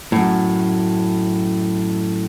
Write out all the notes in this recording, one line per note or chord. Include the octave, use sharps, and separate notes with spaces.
F#2 A2